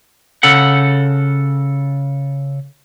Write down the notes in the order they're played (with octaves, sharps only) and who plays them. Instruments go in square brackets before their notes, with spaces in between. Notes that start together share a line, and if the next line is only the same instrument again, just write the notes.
[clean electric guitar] C#3 A4 F#5